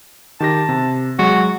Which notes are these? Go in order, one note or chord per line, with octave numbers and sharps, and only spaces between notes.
D#3 G4 A5 A#6
C3
F#3 G#3 F#4